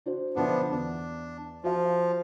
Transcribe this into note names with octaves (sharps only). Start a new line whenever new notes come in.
D4 F#4 C5
B1 D3 F3 B3 D4 E5
E2 D4
F3 F#4 F5